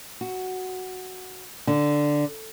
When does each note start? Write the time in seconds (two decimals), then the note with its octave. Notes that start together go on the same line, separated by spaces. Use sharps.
0.21 F#4
1.67 D3